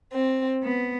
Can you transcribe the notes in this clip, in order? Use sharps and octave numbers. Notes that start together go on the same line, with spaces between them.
C4
B3